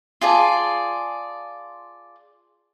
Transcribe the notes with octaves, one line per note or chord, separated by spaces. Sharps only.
F4 G#4 D5 A5